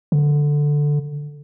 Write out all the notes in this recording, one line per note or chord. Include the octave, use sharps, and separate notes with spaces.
D3